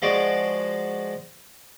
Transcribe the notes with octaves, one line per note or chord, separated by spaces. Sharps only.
F3 G#3 F#4 D5